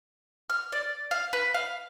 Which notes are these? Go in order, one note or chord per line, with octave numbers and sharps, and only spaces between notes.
F6
D5
F5
B4
F5